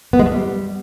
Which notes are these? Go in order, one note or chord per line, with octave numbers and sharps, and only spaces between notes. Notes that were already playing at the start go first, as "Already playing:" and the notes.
B3
G#3
A3
G3